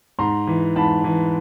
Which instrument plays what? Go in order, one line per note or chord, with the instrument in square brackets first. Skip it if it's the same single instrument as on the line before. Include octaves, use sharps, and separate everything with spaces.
[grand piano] G#2 A#5 C6
E3
G#2 A5 B5
E3